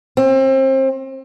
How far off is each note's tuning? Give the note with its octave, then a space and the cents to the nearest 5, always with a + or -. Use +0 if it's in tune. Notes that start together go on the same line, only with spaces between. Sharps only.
C4 +30